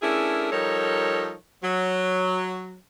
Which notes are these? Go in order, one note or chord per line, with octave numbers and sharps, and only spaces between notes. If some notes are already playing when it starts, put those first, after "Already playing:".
A3 C#4 D4 E4 G#4 A#4
F3 G3 D#4 A4 A#4 C#5
F#3